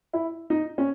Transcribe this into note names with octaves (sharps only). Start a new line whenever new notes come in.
E4
D#4
C#4